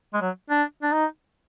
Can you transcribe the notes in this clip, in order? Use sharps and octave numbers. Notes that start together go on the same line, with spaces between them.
G#3
F#3
D4
D4
D#4